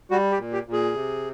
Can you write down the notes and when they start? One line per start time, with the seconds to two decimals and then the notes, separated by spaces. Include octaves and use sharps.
0.11 G3 F#4
0.32 G4
0.38 A#2
0.53 G4
0.67 A#2
0.73 G#4
0.94 C3